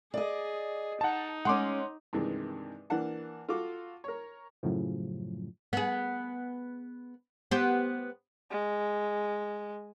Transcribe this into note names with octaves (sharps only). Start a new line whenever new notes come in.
G#4 D5 D#5
D#4 F#5 A5
G#3 C#4 F#5 C6 D6
G2 C3 D#3 E3 G#3
E3 A#3 D4 F#5 A5
F4 F#4 A4 D6
A#4 C#5
F#2 A2 C#3 F3
B3 G#4
B3 G4 C5
G#3